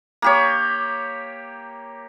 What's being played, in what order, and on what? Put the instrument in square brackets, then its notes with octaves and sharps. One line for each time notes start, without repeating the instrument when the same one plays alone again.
[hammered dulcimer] A#3 G4 C#5